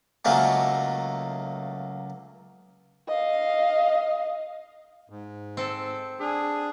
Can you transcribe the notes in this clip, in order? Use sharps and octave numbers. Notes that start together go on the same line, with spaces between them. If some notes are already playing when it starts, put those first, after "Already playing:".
C#2 F#3 A3 A#3
D#5 F5
G#2
C4 A4
D4 G#4